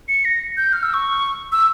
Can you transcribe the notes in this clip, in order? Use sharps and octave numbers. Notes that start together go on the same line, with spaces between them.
C#7
A#6
G6
F6
E6
C#6
E6